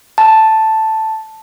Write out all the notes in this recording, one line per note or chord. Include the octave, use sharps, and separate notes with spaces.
A5